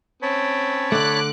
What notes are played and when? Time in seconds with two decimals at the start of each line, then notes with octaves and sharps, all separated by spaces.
0.22 C4 C#4 C#5 A5 B5
0.92 D3 A3 D6 F#6